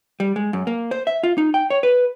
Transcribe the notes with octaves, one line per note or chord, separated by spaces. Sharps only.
G3
G#3
F#2
A#3
C5
E5
F4
D#4
G5
C#5
B4